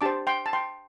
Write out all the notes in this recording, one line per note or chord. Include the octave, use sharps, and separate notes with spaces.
D4 G4 C5 A5 D6
G5 C6
A5
G5 C6